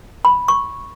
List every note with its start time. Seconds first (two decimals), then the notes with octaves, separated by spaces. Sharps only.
0.25 B5
0.48 C#6